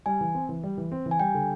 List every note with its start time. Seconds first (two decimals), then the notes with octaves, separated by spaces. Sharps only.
0.06 G3 G#5
0.21 E3
0.35 C4
0.49 E3
0.64 G3
0.77 E3
0.92 C4
1.06 E3
1.11 G#5
1.20 G3 G5
1.34 D3